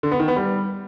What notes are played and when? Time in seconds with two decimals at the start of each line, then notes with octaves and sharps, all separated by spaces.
0.03 D3
0.11 B3
0.20 D#3
0.28 B3
0.36 G3